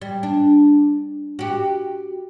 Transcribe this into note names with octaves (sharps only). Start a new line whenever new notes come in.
G3
D4
F#4 G4